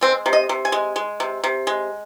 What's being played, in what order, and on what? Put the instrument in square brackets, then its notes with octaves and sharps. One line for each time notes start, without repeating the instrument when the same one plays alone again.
[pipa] G#3 C4
C3
D#5
C3
G#5
G#3
G#3
C3
C3
G#3